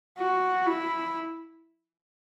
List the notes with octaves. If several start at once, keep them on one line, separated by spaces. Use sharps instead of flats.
F#4
E4